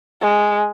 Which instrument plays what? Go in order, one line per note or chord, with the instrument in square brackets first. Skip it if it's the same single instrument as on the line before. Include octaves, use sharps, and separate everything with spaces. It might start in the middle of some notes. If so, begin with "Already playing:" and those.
[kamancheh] G#3